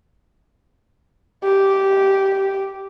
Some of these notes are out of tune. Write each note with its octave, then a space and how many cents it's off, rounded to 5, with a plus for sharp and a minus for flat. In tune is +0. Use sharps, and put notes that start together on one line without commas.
G4 -10